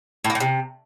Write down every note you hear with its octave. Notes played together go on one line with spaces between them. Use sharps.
A2
A#3
A2
C3